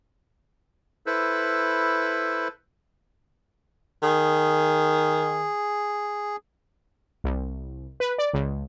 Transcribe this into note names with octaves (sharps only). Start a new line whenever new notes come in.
E4 A4 B4 C5
D#3 G#4
C2
B4
D5
C#2